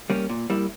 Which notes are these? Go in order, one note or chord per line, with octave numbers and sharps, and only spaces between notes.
G3 A#3 C#4
A#2
G3 A#3 E4